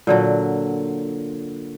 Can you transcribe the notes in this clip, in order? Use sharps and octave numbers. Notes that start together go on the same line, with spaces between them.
A#2 D3 F#3